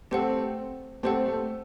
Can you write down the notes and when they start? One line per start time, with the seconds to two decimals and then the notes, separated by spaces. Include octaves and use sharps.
0.11 A3 C4 G4 C5 F#5
1.03 A3 C4 G4 C5 F#5
1.26 A3